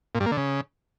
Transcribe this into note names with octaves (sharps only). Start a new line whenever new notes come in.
A#2
G2
A#3
D3
C#3